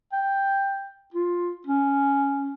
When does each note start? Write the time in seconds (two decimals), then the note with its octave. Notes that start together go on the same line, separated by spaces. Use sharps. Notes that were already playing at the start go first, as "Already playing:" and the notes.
0.13 G5
1.14 F4
1.67 C#4